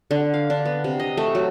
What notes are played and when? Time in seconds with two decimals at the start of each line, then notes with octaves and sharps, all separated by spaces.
0.11 D3
0.34 F5
0.50 D4
0.65 B3
0.84 C3
0.99 D#5
1.17 A3
1.35 F#3